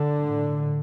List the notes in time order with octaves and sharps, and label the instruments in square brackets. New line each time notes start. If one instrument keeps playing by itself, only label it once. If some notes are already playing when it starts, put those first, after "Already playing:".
Already playing: [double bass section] D3
A2